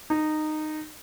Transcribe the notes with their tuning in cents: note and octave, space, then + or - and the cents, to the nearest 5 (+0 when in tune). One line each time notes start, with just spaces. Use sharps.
D#4 -15